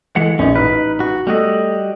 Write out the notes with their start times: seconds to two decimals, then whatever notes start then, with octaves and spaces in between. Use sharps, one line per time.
0.16 E3 G#3 A4 D#5 F#5
0.39 A#1 C#4 D#4
0.55 A1 D#4 B4 F6
1.00 F#4
1.27 G3 A3 F#4 D#5